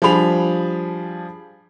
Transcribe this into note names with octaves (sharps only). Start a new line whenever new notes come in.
F3 G3 D4 G#4 B5 F7